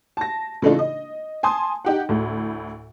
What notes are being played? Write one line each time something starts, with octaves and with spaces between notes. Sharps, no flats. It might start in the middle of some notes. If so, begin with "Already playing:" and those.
A5 A#6
C#3 E3 A3 D4 D#4 F4
D#5
G#5 A5 C6 D#6
D#4 G4 F#5
D2 A2